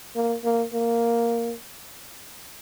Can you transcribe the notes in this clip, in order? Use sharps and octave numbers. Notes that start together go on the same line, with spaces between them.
A#3
A#3
A#3